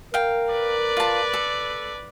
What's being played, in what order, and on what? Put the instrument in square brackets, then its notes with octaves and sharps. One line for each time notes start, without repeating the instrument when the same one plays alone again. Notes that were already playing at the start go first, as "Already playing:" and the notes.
[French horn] A#4 [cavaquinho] F5 G5
[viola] B4 D5
[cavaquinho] F4 A5
A4